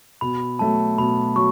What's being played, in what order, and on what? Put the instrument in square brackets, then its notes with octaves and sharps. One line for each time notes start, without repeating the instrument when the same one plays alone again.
[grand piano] B2 [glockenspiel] B5
[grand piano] F#3 A3 [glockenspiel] A5
[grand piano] B2 [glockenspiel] B5
[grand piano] F#3 [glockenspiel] C#6